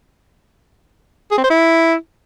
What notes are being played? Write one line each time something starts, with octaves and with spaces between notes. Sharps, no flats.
G#4
C4
C5
E4